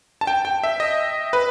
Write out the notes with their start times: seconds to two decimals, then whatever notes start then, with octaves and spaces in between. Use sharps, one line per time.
0.21 A5
0.27 G5
0.45 G5
0.63 E5
0.80 D#5
1.33 B4